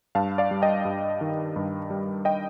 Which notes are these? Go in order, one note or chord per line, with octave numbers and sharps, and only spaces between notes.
G2 F5 A5
D5 F5
G3
D#5 G5
G2
D#3
G2
G3
D#5 G5